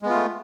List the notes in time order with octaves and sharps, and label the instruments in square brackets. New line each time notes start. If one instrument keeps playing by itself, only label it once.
[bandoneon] G#3
B3
F4
A3